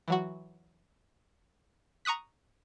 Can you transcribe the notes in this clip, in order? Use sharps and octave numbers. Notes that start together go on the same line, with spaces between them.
E3 F#3 F#4
A#5 C#6 D#6 F#6 B6